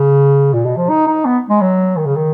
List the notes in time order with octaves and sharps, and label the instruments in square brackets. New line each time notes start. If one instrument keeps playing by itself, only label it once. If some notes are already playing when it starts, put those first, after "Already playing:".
Already playing: [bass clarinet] C#3
A#2
B2
F3
D#4
D#4
B3
G#3
F#3
D#3
C#3
D#3